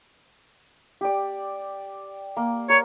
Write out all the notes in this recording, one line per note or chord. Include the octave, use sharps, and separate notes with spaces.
G4 D5
A#3
A#4 C#5